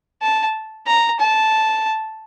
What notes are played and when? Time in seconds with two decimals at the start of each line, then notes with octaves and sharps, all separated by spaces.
0.22 A5
0.86 A#5
1.20 A5